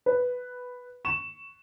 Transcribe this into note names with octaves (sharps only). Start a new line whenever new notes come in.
B4
C#6 E7